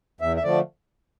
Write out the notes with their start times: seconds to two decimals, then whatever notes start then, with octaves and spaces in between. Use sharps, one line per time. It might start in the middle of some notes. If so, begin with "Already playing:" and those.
0.21 E2 E5
0.36 E5
0.43 D3 F3 A3 D5